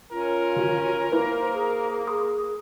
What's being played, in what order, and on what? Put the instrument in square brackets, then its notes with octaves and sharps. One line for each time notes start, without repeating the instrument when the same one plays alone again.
[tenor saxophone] C#4 [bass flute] F4 [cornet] A#4
[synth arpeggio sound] D3 F#4
[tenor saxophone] A#3 [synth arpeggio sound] E4 B4 [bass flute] C5
[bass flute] G#4
[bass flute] G#4 [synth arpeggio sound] B5 C6 D#6